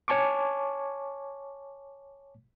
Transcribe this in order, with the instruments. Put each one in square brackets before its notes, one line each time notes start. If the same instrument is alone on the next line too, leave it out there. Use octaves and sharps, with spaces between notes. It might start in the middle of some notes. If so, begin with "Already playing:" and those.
[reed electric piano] C#5 G#5 A5 C#6 D6